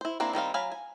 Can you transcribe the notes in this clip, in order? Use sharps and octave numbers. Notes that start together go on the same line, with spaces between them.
E4 C5
A#3 C4 D4 E4
D#3 G3 C4 F5
F#3 F5 G#5 B5
G#5